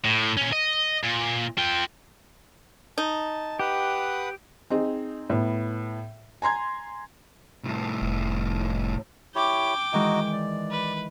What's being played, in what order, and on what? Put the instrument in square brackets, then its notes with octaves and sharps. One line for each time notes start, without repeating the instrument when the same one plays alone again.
[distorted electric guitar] A2
A#2 C#4
D#5
A#2
F4 G5
[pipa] D#4 [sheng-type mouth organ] A5
[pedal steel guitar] G4 [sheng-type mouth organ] B4 F#5 D#6
[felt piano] C4 D#4 G#4
A2 B3
G#5 A#5 C6 G#6
[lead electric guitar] C2 A2
[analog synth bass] F1
[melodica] E4 G4 C#5 [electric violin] G5 D6
[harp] D#3 E3 G#3 [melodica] D#4 F#4 D#5
[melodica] D5
[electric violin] B4